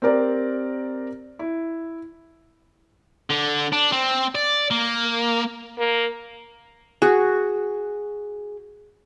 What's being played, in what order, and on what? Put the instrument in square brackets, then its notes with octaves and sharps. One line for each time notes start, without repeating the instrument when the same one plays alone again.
[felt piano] C4 G4 A#4 D5
E4
[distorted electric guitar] D3
D4
C4
D5
A#3
[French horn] A#3
[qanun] F#4 [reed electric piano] G#4